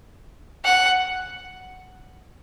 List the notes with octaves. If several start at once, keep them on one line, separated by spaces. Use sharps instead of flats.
F#5